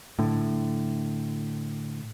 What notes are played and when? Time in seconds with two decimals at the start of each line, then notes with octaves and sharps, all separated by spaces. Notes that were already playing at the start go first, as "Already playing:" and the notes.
0.19 A2 D3